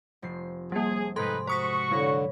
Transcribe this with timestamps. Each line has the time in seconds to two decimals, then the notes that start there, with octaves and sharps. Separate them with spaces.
0.22 F1 F3 C7
0.72 G3 A#3 G#4
1.16 G#2 C3 G#3 D#4 A4 B4 C6
1.47 F#4 C5 C#6 D#6 B6
1.91 D3 F#3 B4 C#5 A#6